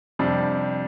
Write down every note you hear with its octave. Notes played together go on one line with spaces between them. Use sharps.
F2 C3 G3 D4